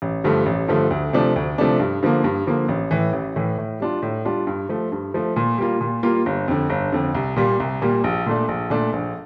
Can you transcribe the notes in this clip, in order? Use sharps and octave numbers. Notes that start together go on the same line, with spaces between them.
A1
G2 D3 F3 A3
A1
G2 D3 F3 A3
D2
C3 F3 A3 D4
D2
C3 F3 A3 D4
G2
D3 F3 A#3
G2
D3 F3 A#3
A1
A2 E3
A1
A2 E3
A2
G3 D4 F4
A2
G3 D4 F4
G2
F3 A3
G2
F3 A3
A#2
G3 A#3 F4
A#2
G3 A#3 F4
G1
F2 D3
G1
F2 D3
C2
A#2 G3 A#3
C2
A#2 G3 A#3
A#1
A#2 A3 D4
A#1
A#2 A3 D4
A#1